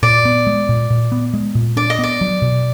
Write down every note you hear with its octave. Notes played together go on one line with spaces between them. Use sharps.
A#2 D5
B3
G#3
A#2
A#2
B3
G#3
A#2
D4 D5
D#5
B3 D5
F#3
B2